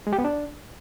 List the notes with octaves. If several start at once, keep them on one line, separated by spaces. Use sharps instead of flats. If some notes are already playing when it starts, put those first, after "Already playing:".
G#3
G4
B3
D4